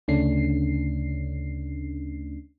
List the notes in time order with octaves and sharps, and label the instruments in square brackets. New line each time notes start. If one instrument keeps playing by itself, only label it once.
[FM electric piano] D2 C#3 A3 C#4 D4 C7